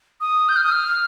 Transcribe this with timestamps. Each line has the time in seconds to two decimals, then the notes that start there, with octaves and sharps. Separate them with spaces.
0.21 D#6
0.49 G6
0.56 F6
0.64 D#6
0.72 F6